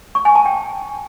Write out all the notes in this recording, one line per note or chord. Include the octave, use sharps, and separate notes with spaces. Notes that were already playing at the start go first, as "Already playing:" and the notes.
C#6
G#5
A5
G5